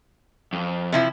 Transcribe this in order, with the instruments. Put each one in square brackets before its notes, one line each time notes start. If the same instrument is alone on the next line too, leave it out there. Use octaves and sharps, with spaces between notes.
[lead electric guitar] F2
[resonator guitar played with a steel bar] C3 F3 E4